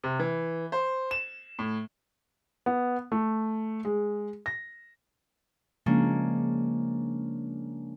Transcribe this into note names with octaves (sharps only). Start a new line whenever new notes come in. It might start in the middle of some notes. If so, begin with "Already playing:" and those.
C3
E3
C5
E7
A2
B3
A3
G#3
A#6
C#3 F3 G#3 A#3 C#4 D4